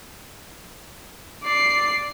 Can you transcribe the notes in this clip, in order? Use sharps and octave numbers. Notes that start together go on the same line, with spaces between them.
D5 C7